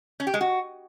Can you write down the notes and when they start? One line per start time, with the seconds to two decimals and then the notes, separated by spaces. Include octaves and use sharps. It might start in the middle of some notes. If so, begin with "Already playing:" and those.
0.20 C#4
0.27 G4
0.34 G#3
0.41 F#4